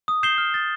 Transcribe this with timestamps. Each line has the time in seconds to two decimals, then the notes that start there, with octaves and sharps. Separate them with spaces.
0.08 D#6
0.23 G6 C7 E7 G7
0.38 F6
0.54 A6 C7